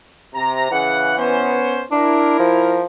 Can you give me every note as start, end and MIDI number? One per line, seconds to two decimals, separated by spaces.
0.34 0.68 48
0.34 0.68 82
0.71 1.14 49
0.71 1.65 52
0.71 1.14 78
1.17 1.83 59
1.17 1.83 61
1.17 1.83 72
1.91 2.34 62
1.91 2.84 64
1.91 2.84 70
2.39 2.84 53